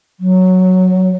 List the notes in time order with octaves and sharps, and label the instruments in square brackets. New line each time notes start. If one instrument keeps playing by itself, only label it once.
[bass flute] F#3